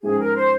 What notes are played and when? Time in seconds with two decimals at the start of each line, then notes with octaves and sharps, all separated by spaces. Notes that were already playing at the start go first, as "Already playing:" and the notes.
0.03 G#2 F3 G#3 C#4 G4 G#4
0.19 A#4
0.35 C5